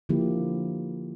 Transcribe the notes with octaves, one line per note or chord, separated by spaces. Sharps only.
D3 F3 A#3 E4 G4